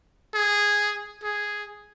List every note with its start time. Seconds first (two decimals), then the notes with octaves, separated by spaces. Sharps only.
0.34 G#4
1.23 G#4